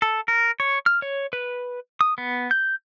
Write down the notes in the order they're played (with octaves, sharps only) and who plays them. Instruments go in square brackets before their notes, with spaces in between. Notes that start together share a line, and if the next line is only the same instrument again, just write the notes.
[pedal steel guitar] A4
A#4
C#5
F6
C#5
B4
D#6
B3
G6